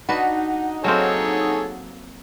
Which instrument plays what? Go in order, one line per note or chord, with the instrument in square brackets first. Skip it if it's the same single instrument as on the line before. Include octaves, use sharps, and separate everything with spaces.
[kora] D4 F#4 B4 [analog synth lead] D#4 [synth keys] F#5
[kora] F#3 A#3 C4 [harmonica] G#4 A4 C#5